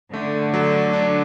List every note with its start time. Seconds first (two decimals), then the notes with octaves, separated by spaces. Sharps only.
0.13 D3 A3
0.54 F#3
0.93 D4